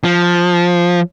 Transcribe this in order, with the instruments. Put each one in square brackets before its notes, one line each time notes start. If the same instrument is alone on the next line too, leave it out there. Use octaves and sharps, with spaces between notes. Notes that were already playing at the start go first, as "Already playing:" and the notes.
[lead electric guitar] F3